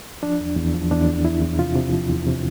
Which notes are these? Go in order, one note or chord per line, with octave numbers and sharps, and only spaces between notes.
F3 D4
E2
E2
F3
E2 D4
E2
E2 E4
E2
C3 F4
C3
F3
E2
C3